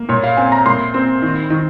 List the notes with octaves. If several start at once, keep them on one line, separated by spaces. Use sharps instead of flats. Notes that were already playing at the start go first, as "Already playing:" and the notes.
Already playing: A#3
A#2 C#5
F5
C4 G#5
A#5
A#2 C6
C4
D#3
D#3